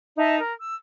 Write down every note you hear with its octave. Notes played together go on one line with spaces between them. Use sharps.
D#4 D#5 E5 A5
A#4
E6